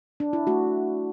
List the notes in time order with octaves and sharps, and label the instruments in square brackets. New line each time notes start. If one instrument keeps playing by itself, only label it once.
[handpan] D4
E4
A3 F#4